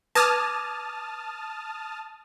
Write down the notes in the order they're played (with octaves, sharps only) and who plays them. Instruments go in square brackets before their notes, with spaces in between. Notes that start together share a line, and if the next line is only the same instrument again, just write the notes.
[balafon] B4 [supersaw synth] A5 D#6 F6 [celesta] D6 G#6 A#6